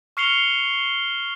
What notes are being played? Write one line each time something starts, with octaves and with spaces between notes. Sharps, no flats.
C#6 F6 C7 C#7 F7 G7